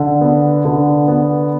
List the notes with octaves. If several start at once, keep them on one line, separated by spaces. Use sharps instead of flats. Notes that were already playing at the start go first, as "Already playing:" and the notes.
Already playing: D3
B3
D3
B3